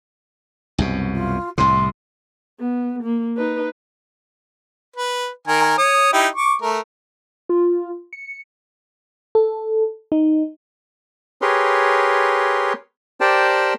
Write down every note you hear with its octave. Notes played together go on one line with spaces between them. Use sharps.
C2 F#2 B2
F4
C2 A2 C3 C6
B3
A#3
D#4 B4
B4
D#3 A#4 G#5
C#5 D#6
D#4 E4 G4
C#6 D6
A3 A#4
F4
C#7
A4
D#4
G4 G#4 A#4 B4 C#5 C6
G4 A#4 C5 D5 G5 A5